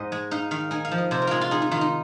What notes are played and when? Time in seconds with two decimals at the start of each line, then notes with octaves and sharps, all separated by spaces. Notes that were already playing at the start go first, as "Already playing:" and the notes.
Already playing: G#2 C5 D#5
0.12 G#3
0.31 D#4 F5
0.51 D#3 F5
0.71 D#4 G#5
0.85 F5
0.91 F3
0.98 D#5
1.11 C3 C5
1.22 A#4
1.27 G#3 F4 G#4
1.41 F4
1.51 D#4 G#4
1.62 D#4
1.71 D#3 F4
1.81 D#4